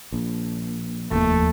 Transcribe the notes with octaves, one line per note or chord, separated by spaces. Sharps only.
A#1
F1 D#2 F3 A3